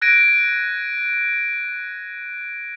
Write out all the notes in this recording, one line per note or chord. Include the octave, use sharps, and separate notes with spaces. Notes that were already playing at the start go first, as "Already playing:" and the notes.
F#6 G#6 A#6 D7 D#7